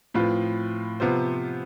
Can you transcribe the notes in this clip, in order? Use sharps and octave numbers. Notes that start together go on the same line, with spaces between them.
A2 F3 C4 F4 B4
C3 F3 B3 F4 C5